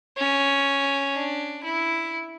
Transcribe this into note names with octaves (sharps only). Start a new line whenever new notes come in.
C#4
D4
E4